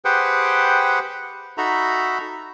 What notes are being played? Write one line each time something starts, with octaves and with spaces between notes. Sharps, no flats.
G4 G#4 B4 C5 F#5 G5
D#4 F#4 A4 E5 A#5 B5